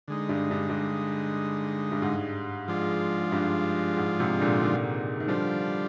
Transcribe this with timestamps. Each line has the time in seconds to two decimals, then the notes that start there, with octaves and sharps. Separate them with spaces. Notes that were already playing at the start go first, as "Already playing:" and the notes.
0.08 D3 G#3 D#4
0.29 G2
0.51 G2
0.69 G2
1.92 G2
2.02 G#2
2.68 F3 G#3 D4 F4
3.32 G2
3.97 G#2
4.19 G#2 C3
4.41 A#2 D3
4.62 C3 D#3
5.20 D#3
5.28 D3 F3 G3 D4 F4